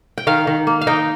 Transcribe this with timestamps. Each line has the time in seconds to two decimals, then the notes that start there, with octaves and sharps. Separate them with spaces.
0.18 G5
0.27 D#3 F5
0.47 D#3
0.67 A#3
0.81 F5
0.87 D#4 G5